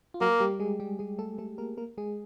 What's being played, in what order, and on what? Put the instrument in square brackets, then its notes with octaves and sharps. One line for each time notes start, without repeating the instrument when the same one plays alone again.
[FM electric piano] F4
[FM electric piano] F#3 F#4 [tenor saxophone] A#3
[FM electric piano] G3 G4
G#3 G#4
G3 G4
G#3 G#4
A3 A4
A3 A4
A#3 A#4
A#3 A#4
G#3 G#4